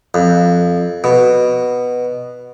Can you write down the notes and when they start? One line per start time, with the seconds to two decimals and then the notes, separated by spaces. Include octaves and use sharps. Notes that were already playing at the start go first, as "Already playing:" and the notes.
0.14 F2
1.04 B2